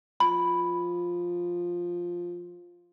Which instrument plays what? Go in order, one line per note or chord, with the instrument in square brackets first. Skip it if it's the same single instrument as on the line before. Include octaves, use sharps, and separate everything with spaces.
[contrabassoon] F3 [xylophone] B5